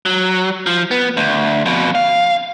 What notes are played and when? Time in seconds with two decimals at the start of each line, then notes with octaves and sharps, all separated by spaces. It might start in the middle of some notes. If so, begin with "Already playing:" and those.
0.06 F#3
0.67 F3
0.91 B3
1.17 D2
1.66 F2 B2
1.95 F5